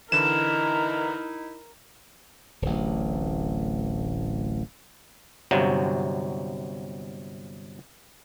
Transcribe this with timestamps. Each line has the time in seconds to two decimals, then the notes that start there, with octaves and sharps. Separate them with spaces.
0.12 D3 E3 D#4 E4 A#4 E7
2.62 D1 A1
5.51 G1 C3 F#3